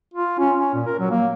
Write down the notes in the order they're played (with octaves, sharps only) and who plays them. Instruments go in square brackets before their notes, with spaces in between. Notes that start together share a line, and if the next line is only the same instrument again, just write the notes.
[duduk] F4
C#4
C#4
A#2
A#4
F#3
A#3